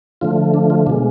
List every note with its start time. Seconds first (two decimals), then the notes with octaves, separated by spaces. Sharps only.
0.21 D3 F3 A3 F4
0.54 D4
0.70 F4
0.87 B2 D4
0.90 G#3